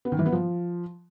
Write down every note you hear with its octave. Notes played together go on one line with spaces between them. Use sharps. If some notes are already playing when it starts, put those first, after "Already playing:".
B3
D#3
E3
B3
F3